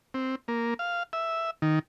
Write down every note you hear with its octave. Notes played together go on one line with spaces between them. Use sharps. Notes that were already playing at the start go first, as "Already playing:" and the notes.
C4
A#3
F5
E5
D#3